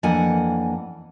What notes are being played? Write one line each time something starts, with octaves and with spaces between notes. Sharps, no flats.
F2 E3 A#3 D4 F#5 G#5